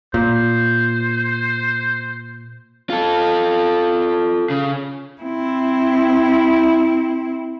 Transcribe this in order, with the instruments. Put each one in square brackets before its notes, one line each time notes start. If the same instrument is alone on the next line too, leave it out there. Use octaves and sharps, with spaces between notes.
[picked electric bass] A#2 [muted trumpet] C5
[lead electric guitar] F4 A4
C#3
[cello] C4 E4